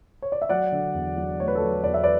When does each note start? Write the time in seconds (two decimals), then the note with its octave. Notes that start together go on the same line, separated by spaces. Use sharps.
0.22 C#5
0.32 D5
0.42 E5
0.49 F#3 D5 F#5
0.72 D3
0.94 E2
1.17 F#3
1.39 A3 C#5
1.48 B4
1.55 A4 C#5
1.62 F#3
1.84 E2 D5
1.94 E5
2.04 B4 D5